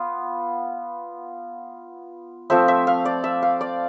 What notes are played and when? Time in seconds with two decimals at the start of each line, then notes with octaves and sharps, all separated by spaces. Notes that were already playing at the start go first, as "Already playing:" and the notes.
Already playing: B3 F4
2.50 F3 A3 C4 E5
2.68 E5
2.87 F5
3.05 D5
3.24 E5
3.43 F5
3.61 D5